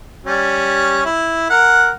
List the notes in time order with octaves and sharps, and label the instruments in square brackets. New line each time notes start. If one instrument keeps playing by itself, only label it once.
[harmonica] G3 C#4
E4
A#4 F#5